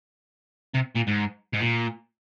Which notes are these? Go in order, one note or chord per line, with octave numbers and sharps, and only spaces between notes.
C3
A#2
G#2
G#2
A#2